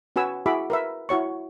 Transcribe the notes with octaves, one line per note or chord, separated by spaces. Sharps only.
C#4 F#4 B4 G#5 E6
E4 F#4 G#4 E5 B5 D6
A#4 B4 E5
E4 F#4 C#5 C#6